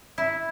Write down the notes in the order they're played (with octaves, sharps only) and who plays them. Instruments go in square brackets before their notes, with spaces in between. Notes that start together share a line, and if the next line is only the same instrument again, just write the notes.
[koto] E4